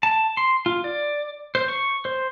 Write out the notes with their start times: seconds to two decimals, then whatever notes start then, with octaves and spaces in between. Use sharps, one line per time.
0.03 A5
0.37 C6
0.66 F4
0.84 D5
1.55 C5
1.68 C#6
2.05 C5